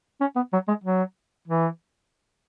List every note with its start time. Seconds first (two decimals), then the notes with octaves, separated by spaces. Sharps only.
0.21 C#4
0.36 B3
0.53 F#3
0.68 G#3
0.84 F#3
1.48 E3